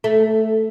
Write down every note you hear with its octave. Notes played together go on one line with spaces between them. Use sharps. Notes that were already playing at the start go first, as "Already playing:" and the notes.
A3